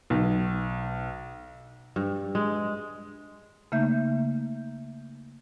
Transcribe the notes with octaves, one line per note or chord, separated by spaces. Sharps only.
B1
G2
G#3
C#3 A3 A#3 D#4 E5 G6